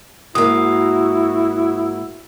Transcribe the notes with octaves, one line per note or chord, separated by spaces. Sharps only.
G#2 A#3 E4 F#4 D#6